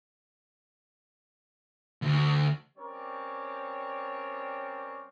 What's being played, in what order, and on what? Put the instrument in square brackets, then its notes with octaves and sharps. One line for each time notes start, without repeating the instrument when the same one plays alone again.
[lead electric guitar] D2
[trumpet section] G3 C4 C#4 A#4 C#5 D5